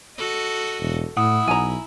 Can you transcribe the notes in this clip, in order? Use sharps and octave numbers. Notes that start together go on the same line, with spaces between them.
F#4 A4 D#5
E1
A2 E4 F#5 D#6
B1 G#5 A#5